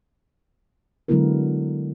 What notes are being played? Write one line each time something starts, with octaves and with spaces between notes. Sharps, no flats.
D3 F#3 G#3 B3 E4 A#4